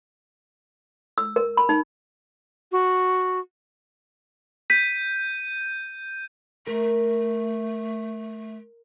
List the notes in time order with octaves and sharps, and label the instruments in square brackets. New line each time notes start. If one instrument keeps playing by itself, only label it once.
[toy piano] E6
A#4
B5
D#4
[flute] F#4
[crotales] G6 D#7 [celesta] B6
[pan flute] A3 [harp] A#4